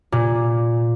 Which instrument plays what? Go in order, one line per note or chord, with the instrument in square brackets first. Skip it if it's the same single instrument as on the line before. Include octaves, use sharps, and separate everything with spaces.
[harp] A#2